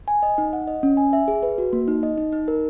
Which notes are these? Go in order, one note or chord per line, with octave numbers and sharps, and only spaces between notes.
G#5
D#5
D#4
F#5
D#5
C#4
G#5
E5
G#4
B4
F#4
A#3
D#4
D#5
D#4
D#4
A#4